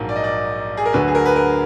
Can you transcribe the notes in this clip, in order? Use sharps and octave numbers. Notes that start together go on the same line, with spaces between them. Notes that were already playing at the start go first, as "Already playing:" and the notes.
Already playing: A#1 G#2 F#3 A#3
D5
D#5
D5
G#4
A#4
D2 D3 F#3 B4
G#4
A#4
B4
A#4